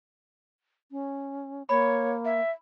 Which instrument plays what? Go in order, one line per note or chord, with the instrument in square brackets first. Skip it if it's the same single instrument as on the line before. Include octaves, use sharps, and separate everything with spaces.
[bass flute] C#4
[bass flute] A#3 [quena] C#5 [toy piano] B5
[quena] E5